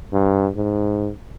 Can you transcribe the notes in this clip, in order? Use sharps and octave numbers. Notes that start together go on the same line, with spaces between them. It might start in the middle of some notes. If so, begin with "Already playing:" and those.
G2
G#2